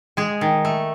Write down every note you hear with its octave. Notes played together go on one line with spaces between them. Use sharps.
G#3 G#4
D#3
A3